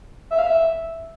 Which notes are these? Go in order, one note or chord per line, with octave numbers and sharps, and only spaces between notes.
E5
F5
E5